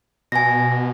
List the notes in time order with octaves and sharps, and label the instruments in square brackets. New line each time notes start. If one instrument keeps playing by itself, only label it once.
[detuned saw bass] B2 [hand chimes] G#5 A#6